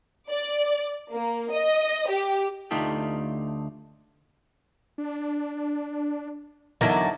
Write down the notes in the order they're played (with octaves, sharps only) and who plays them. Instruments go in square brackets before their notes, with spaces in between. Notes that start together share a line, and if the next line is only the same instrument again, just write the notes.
[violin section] D5
A#3
D#5
G4
[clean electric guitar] D2 A3 D#4 F4 G4
[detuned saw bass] D4
[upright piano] E2 A#4 A#6 [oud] D3 F#3 [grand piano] D#4 E4